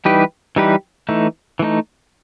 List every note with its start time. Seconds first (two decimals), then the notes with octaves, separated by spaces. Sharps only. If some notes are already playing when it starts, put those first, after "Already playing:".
0.05 E3 G3 D#4 G4 B4
0.56 E3 G3 D#4 G4 B4
1.09 E3 A3 D#4
1.59 E3 A3 D#4